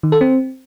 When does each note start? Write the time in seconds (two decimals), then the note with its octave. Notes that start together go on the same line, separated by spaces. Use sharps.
0.03 D#3
0.12 A4
0.21 C4